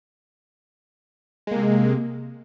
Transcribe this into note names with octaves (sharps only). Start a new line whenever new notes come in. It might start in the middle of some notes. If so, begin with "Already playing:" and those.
C3 G#3 A#3